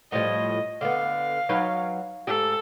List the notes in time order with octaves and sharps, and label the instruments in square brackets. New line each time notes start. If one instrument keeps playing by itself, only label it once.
[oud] A2 F3 G3 [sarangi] D#5
[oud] D3 B3 [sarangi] F5
[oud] F#3 D#4 B4
[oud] G#2 G4 [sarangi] A4